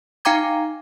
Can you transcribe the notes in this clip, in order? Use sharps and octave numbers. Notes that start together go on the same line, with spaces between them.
D#4 F5 G5 A#5 D6 G#6